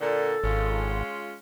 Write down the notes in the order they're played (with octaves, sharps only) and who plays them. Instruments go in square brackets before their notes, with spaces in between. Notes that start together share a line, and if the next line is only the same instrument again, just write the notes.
[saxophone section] A#2 D3 [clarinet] A4
[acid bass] G#1 [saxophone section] G#3 C#4 F4